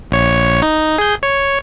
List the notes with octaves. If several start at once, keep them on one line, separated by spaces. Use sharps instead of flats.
A#1 C#5
D#4
G#4 G6
C#5